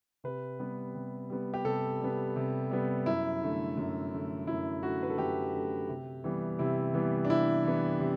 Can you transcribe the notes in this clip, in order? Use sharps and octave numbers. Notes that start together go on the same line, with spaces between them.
C3 B4
G3 B3
C3
G3 B3
G4
C3 A4
G3 B3
C3
G3 B3
F#2 E4
D3 A3
F#2
D3 A3
F#2 E4
D3 A3 F#4
B4
A4
F#2 G4
D3 A3
C3
E3 G3 B3
C3 E4
E3 G3 B3
D4
C3 E4
E3 G3 B3
C3